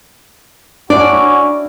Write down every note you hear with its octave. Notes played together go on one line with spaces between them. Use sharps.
C#4 D4 E4 F#4 D5